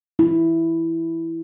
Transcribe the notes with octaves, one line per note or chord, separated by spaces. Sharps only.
E4